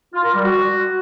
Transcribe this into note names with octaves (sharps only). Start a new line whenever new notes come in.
F4
A#4
G3
F#4